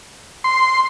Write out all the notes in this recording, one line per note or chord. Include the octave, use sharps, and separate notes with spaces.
C6